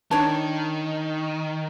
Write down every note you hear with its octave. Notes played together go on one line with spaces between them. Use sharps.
D#3 D4 C#5 A5